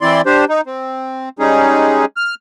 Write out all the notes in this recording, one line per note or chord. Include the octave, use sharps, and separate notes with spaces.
E3 C4 E4 D5 C6
D4 G4 C5
D#4
C4
G3 G#3 C#4 D#4 G#4
F6